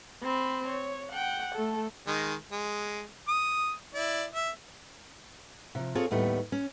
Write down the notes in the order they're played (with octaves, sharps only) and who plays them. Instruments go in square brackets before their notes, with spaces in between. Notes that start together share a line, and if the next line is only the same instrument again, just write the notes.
[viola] C4 B5
C#5
F#5 G5
A3 A4
[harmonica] D#3 G#3
G#3
D#6
E4 D5
E5
[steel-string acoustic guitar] C3 F3
C4 F4 G#4 A4 C#5
D#2 A2 G3 A3 B3
C#4